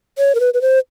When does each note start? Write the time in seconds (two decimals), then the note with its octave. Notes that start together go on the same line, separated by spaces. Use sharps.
0.18 C#5
0.35 A#4
0.40 B4
0.54 B4
0.62 C5